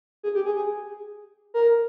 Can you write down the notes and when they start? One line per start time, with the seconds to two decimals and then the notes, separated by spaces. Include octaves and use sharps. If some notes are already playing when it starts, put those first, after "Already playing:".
0.23 G#4
0.35 G4
0.46 G#4
0.56 G#4
1.54 A#4